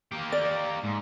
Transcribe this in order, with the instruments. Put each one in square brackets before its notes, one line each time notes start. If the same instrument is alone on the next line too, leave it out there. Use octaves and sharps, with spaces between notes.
[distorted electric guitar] A#3 G4
[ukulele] D5
[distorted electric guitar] G#2